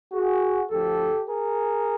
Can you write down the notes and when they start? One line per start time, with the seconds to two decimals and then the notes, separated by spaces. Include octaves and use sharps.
0.12 F#4 G#4
0.70 D2 D3 F3 G4 A4
1.28 G#4 A#4